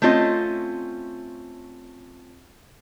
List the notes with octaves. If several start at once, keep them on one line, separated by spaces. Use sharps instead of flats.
A3 C4 C#4 F4 D#5